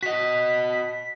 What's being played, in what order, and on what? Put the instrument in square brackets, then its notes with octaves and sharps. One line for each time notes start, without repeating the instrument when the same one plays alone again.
[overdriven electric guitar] F#4 D#5 [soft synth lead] B6